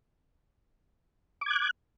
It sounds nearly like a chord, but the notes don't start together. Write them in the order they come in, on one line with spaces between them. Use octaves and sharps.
D6 G#6 F#6